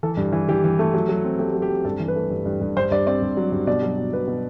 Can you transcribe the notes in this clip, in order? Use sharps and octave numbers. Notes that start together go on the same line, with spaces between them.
E3 A4
G2
E3
E3 G4
E3
A3
F#3
F#3
C4
A3 G4
F#3
G4
C4
G2 A4
E3
B4
A3
G2
G2
G2
G2 C5
G2 D5
C4 D5
G2
F#3
G2
B2 D5
F#3
B2
B2 B4
B2